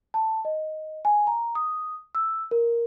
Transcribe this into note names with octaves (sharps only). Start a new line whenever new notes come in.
A5
D#5
G#5
A#5
D#6
E6
A#4